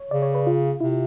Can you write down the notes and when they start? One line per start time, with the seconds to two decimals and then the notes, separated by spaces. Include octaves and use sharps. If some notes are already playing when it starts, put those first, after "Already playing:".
Already playing: C#5
0.11 C#3 D5
0.22 C#5
0.35 B4
0.47 F4
0.80 C3 E4